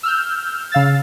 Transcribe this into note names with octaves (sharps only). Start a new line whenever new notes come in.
E6 F6 G6
C#3 F5 E6 A6